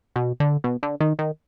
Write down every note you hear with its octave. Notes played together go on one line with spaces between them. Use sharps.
B2
D3
B2
D3
D#3
D#3